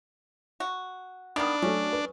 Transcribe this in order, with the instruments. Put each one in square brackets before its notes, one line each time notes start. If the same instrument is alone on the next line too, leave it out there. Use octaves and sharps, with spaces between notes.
[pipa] F#4
[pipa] D#3 A#3 B3 [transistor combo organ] D4 [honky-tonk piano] D#6 F6
[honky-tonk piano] F#3 A3 [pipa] C#4
[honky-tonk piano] B4